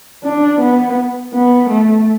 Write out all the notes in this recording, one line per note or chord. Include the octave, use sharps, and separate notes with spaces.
D4
B3
B3
A3